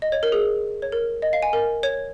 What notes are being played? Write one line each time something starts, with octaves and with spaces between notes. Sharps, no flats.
D#5
C#5
A#4
G#4
C#5
A#4
D#5
F5
G#5
A#4
C#5